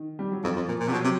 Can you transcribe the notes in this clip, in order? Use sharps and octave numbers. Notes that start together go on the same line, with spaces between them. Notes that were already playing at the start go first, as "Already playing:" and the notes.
Already playing: D#3
G3
F#3
F2 F3
F2
A#2
A#2
C3
B2 F#3
C3